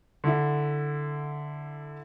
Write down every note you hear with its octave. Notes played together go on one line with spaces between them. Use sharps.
D3 E4